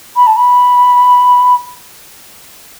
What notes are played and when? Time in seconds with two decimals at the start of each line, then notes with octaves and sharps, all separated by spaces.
0.16 B5
0.26 A5
0.36 B5